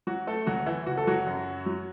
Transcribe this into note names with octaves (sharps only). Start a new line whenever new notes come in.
F#3 F#4
A3 A4
D2 F#3 F#4
E3 E4
F#1 F#4
A4
F#3 F#4
F#2
F#3